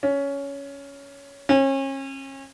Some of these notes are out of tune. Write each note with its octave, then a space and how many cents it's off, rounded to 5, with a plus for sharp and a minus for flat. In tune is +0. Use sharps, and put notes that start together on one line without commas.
C#4 +10
C#4 -35